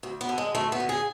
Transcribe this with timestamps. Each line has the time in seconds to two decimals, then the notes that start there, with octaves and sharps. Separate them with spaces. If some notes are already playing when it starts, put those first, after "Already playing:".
0.03 D2
0.21 B3
0.29 D3
0.38 G#3
0.55 D2 A3
0.72 B3
0.80 D3
0.89 G#4